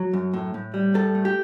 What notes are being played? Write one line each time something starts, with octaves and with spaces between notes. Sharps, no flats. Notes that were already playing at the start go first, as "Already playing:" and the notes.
Already playing: F#3 C#5
F#2
A2
A2
G3
A2 A4
A3
G4